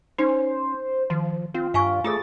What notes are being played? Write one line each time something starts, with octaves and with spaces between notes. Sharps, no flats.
C#4 D#4 C5
D#3 F3
C4 F4
G2 F5 G#5 C#6
A3 F4 G#4 A4 A6